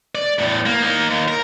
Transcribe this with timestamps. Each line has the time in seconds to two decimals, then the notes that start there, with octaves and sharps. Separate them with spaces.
0.15 D5
0.38 E2 A2
0.65 A#3
0.82 A#3 D#4
1.10 D#2
1.28 A#4